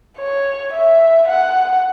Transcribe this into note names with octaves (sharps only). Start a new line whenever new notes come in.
C#5
E5
F#5